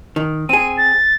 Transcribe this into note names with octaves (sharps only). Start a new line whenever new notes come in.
D#3
C4 G#4 D#7
A6